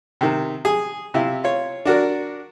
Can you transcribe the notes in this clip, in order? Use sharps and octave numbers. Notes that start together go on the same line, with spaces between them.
C3 D#3
G#4
C3 E4 F4
F4 C#5
D4 F#4 A#4 D5